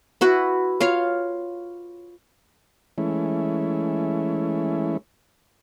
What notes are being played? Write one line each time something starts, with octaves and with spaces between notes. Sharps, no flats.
E4 F#4 B4
F4 C#5 F5
E3 G#3 A3 C#4 E4